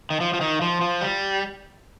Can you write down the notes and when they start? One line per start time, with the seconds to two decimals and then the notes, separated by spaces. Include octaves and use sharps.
0.10 D#3
0.21 F3
0.34 F3
0.41 D#3
0.61 F3
0.81 F3
1.01 G3